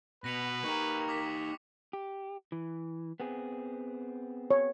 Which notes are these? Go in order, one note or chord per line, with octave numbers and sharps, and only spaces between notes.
B2 B4 A#6 C#7 F7
D#4 G4 A#4 C#6 C#7
D6 B6
G4
E3
B3 C4 G#4
C#5